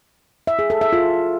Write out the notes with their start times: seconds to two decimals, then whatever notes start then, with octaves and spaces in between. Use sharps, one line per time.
0.47 E5
0.59 G#4
0.70 A4
0.81 E5
0.93 F4